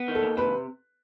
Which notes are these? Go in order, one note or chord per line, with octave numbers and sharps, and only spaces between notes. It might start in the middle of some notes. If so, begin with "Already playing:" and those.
Already playing: B3
D#3
A4
D#2
C3 B4